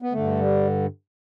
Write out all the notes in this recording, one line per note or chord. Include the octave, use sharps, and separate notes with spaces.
B3
G2 D3 A3
G3